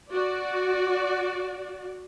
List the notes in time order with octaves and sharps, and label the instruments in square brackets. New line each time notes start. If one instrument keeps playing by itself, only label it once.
[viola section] F#4 D5